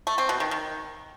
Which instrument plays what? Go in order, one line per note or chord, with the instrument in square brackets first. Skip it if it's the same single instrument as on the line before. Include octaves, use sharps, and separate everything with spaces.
[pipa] A3
C4
B2
D#3
D#3